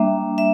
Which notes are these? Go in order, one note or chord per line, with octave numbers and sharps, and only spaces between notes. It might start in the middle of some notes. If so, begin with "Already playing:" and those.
Already playing: G3 A#3 D4 E5
E5